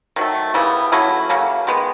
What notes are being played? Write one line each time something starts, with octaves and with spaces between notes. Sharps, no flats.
D#3 F#3 A3
C#3 E3 G3 B3
F#3 A3 C#4 E4
C#3 F#3 A#3
D#3 G#3 B3